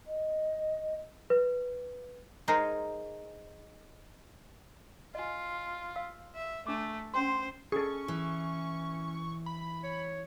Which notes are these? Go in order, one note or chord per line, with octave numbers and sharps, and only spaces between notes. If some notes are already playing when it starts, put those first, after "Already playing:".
D#5
B4
G#3 D#4 G#4 A#4 C5
F4 D#5 G#5
F5 E6
E5
A3 D4 D6
C#4 C5 G5 C6
C#4 G#4 A4 C#6
E3
B5
C#5